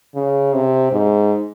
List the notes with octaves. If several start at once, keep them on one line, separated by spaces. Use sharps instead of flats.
C#3
C3
G#2